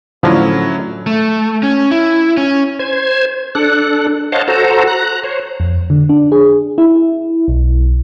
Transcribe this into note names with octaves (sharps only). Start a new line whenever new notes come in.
A2 D3 F3 F#3 C#4 E4
A3
C#4
E4
C#4
C5 G#6
D4 A4 F#6
C5 C#5 D#5 F5 F#5 A5
F#4 A4 C5 A#5
A#5 F#6
C5 C#5
F2
D3
D4
G#4
E4
B1